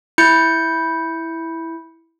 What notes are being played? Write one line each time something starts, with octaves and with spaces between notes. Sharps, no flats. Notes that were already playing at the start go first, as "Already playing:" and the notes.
E4 G6 C#7